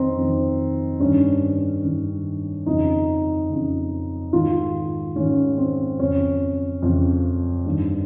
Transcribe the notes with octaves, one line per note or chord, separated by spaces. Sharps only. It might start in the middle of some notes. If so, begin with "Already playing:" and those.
Already playing: F2 D#3 C4 D#4
F2 D#3
G2 D#3 C#4
G2 D#3
F2 C#3 D#4
F2 C#3
G#2 D#3 F4
G#2 D#3 C#4
C4
F2 C#3 C#4
F2 C#3
G2 D#3